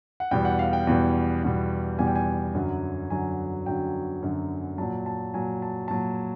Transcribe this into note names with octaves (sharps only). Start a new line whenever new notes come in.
F#5
E2 B2 G3 G5
F#5
F5
G5
E2 B2 G3
E2 B2 G3
E2 B2 G3 G#5
G5
G#5
F#2 D3 F#3
F#2 D3 F#3 G#5
F#2 D3 F#3 G5
F#2 D3 F#3
A#2 F#3 A5
A5
A#2 F#3 G#5
A5
A#2 F#3 A5